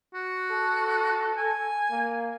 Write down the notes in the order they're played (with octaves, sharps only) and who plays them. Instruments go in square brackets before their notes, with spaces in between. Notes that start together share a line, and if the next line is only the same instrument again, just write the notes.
[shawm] F#4
[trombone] A4
[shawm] G#5
[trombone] A#3